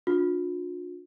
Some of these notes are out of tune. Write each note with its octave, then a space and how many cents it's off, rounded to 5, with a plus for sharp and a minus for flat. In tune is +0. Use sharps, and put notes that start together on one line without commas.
D4 +0 F4 +40